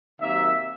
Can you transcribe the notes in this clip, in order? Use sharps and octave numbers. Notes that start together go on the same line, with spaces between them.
C3 D#3 F#3 A#3 E5